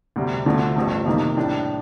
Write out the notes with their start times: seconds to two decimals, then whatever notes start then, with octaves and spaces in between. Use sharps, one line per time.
0.16 D2 C3 G3
0.46 D2 D3 F3 A3
0.76 A1 G2 F3 A3
1.06 F2 C3 D#3 A#3
1.37 A2 G3 D4